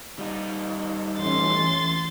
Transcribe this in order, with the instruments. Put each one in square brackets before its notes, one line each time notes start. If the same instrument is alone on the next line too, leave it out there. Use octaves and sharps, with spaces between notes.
[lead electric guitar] G3 D#4
[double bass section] E3 A3 C#4 [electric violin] C6 A6